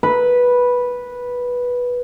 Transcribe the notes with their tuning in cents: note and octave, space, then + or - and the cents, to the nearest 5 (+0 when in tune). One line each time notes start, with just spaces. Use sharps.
B4 -10